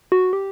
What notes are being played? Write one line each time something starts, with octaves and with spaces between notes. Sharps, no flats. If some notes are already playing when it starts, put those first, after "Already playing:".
F#4
G4